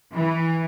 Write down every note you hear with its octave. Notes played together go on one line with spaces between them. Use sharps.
E3